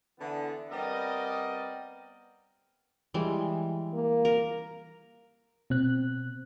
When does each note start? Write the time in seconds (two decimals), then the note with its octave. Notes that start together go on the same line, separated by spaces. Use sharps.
0.19 D3 E3 B3
0.71 G3 B3 C4 A#4 D5 D#5
3.14 E3 G3 G#3
3.93 A#3
4.25 A#4
5.70 B2 C4 F#6